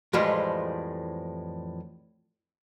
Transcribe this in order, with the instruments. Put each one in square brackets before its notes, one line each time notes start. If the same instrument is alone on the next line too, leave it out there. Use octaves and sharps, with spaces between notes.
[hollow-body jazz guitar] F2 A2 E3 F3 G3 G#3